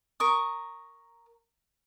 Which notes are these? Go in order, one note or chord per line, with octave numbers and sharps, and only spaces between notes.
A#4 C#6 D#6